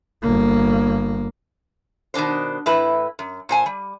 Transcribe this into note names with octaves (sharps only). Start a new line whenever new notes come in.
G1 A#3
B2 D#3 A#3 D4 C5
A2 E4 B4
F#2
A#2 C5 G#5
G3